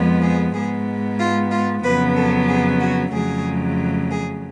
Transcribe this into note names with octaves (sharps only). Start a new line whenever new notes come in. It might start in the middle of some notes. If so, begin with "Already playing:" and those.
Already playing: F2 F3 G#3 B3
G#4
G#2 G#3 B3 G#4
F4
F4
F2 C#3 F#3 B3 B4
A4
G#4
F#4
F2 C#3 F#3 A3 G#4
G#4